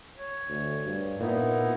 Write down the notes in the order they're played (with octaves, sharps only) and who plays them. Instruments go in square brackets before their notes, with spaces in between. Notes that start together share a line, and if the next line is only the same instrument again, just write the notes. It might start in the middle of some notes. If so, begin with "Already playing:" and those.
[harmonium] C#5
[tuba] D2
G2
[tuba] A#2 [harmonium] B3 D#4 E4